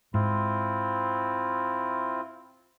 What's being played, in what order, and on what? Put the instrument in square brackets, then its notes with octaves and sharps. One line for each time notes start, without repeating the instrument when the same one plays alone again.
[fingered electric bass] G#2 [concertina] C4 E4 F4